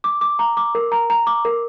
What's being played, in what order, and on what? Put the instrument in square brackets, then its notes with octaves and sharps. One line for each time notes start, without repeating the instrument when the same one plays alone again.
[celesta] D6
D6
A#5
D6
A#4
A#5
A#5
D6
A#4